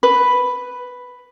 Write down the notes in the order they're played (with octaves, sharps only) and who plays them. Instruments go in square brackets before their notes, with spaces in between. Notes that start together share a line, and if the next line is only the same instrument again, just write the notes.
[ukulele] B4